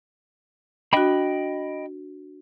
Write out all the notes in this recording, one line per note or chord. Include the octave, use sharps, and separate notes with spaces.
D4 F#4 D#5 G5 B5